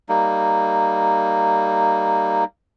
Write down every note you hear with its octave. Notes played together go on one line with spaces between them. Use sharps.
G3 A#3 D#4